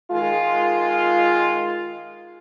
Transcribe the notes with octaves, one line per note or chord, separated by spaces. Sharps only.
D#3 G#3 F4